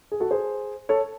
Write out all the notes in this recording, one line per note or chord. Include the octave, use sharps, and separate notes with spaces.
G#4
F#4 A4
G#4 C5
A4 C#5